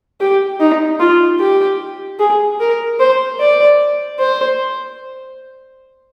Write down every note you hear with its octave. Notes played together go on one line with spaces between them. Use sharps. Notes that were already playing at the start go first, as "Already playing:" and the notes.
G4
D#4
F4
G4
G#4
A#4
C5
D5
C5